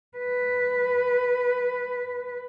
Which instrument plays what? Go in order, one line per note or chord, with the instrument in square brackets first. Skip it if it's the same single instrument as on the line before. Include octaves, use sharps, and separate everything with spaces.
[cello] B4